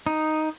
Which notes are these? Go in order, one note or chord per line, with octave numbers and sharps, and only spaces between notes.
D#4